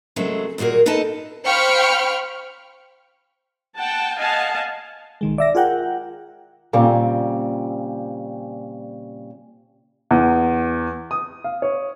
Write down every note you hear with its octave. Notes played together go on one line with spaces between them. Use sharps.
D#2 C#3 F#3 G#3 A3 C4
D#2 A#2 F#4 G#4 A#4
B3 D#4 A4 B4 D#5 A5
C5 F5 G5 B5 C#6 F6
F#5 G5 A5
D#5 F5 F#5 G#5 A5
B1 D#3 G#3
D5 E5 A#6
F4 G#4 A#4 F#5 G5
A#2 C#3 G3 C4
E2
D#6
F5
C#5